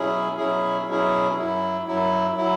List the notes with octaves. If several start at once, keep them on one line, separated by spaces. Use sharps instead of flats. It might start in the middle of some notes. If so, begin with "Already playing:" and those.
Already playing: B2 F#3 C#4 E4 G#4
B2 F#3 C#4 E4 G#4
B2 F#3 C#4 E4 G#4
F#2 F#3 E4
F#2 F#3 E4
F#3 E4